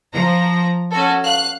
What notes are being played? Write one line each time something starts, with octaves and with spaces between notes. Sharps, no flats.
F3 A#5
C#4 F#4 A4
F5 F#6